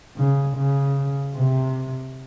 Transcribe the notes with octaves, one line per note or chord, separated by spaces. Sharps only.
C#3
C#3
C3